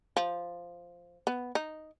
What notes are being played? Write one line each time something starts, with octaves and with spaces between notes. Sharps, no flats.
F3
B3
D#4